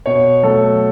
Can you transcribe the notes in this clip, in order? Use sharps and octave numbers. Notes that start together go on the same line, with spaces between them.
B2 C#5
F#3 A3 A4